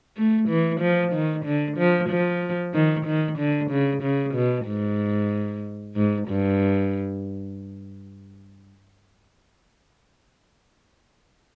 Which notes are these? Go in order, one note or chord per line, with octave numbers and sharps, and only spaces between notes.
A3
E3
F3
D#3
D3
F3
F3
D#3
D#3
D3
C#3
C#3
B2
G#2
G#2
G2